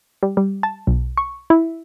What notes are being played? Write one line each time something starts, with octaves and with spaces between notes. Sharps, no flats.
G3
G3
A5
B1
C#6
E4